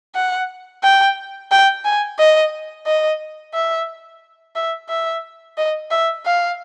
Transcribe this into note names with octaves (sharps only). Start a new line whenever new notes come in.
F#5
G5
G5
G#5
D#5
D#5
E5
E5
E5
D#5
E5
F5